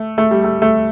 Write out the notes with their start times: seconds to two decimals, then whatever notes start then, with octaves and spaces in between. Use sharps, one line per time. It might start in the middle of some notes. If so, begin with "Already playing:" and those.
Already playing: A3
0.18 A3
0.31 G3
0.44 A3
0.62 A3